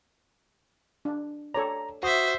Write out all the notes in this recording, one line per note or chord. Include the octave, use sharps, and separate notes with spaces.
D4
A4 C#5 D5 A#5
F#4 C5 E5 D#6